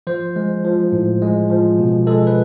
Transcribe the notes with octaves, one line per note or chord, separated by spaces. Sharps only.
F3 C5
G#3
F3
A2
G#3
F3
B2
G#3 A4
B4